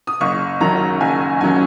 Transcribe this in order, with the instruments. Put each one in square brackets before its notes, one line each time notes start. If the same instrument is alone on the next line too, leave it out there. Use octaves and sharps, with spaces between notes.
[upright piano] D#6
F#1 C#6
F#2 D#3 F#3 C#4 A#5
F#1 G#5
F#2 D#3 F#3 C#4 G#5